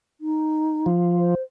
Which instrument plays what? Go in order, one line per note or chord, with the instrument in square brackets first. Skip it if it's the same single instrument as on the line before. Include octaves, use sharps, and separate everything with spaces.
[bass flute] D#4
[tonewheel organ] F3
[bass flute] C5